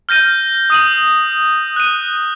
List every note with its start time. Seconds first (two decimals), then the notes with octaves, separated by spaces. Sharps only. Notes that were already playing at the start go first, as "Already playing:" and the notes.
0.09 F6 G6 A#6 D#7
0.70 D#6 D#7 F#7
1.76 F#6 D#7